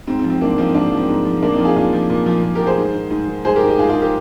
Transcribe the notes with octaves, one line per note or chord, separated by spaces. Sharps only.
G#2 C4
C4
F3
C4
G#2 A#3 D4
F3 C4 D#4
G#2 A#3 D4
F3
C4
G#2
F3
A#2 A#3 D4
C4 D#4
F3
F4 G#4
A#2 D4 F4
F3
A#2
F3
A#2
G4 A#4
F3
G#4 C5
G#2
D#3
G#2
D#3
G#2 G#4 C5
G4 A#4
D#3
D#4 G4
G#2 F4 G#4
F4 G#4
D#3
G4 A#4